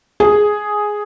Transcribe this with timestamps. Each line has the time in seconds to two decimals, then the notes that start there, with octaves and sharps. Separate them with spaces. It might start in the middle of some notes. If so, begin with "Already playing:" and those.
0.20 G#4 G#5